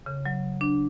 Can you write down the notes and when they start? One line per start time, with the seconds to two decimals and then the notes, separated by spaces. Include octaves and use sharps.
0.06 C#3
0.26 F#3
0.61 D4